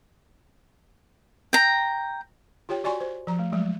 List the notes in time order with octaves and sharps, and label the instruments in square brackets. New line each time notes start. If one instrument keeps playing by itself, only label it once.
[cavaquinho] G5 A#5
[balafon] F4 G4 C#5 G5
F#4 D5 G#5 C6 C#6
C5
F3 A#5
A3
F3 F#3 G#3 A3